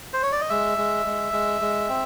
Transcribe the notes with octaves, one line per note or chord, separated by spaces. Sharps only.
C5
C#5
D5
D#5
G#3 E5
G#3
G#3
G#3
G#3
C4